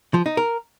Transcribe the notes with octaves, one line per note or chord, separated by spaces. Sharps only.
F3
D#4
A#4